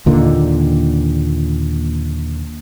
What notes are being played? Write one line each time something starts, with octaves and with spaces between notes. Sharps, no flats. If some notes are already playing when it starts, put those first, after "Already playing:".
D#2 A#2 D3 D#3